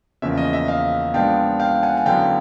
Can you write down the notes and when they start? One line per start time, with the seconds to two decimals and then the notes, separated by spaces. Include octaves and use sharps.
0.22 E2 C#3 F3 A#3 C#4 E5
0.38 D#5
0.53 E5
0.68 D#5 F5
1.14 A#2 F3 G#3 B3 D4 F5 G5
1.60 F5 G5
1.83 F#5 G#5
1.97 G#5
2.06 F#2 D3 F#3 B3 E4 F5 G5